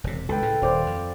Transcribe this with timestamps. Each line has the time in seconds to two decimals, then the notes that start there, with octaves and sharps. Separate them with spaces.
0.04 E1 C3
0.29 C#2 A4 B4 G5
0.42 A2 C#3
0.62 D#1 C5 D5 F5
0.86 F2